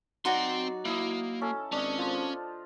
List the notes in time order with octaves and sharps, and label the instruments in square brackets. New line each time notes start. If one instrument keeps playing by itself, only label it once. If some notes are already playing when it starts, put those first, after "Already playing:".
[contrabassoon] F#3 [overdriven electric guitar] C4 C6 [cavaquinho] D#4 F#4 D5
[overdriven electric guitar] A#3 [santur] E4 D#6
[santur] C#4 A4
[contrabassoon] G#1 [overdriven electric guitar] C#4 [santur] D4 D#5
[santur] F3 F4 C5